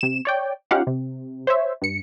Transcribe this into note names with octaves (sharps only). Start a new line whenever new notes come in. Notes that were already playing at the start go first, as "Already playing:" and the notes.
C3 E7
C#5 D5 G5
C#4 D#4 F4 G4 F5 F#5
C3
C5 C#5 E5
G2 C#7